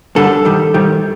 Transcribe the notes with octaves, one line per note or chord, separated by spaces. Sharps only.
F#2 D3 G3 A4
G#2 D#3 G3
G#2 D#3 G3